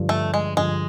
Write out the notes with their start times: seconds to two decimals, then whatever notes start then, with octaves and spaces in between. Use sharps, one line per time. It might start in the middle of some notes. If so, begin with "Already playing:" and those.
Already playing: G2 D3 F3
0.09 A3
0.34 G#3
0.57 G2 D3 F3 G#3